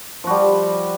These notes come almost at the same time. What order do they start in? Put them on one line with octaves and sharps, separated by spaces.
F3 F#4 G3